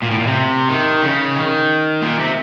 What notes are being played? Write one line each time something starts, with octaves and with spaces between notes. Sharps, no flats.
A#2
A2
A#2
C3
D#3
C#3
D#3
A#2
C3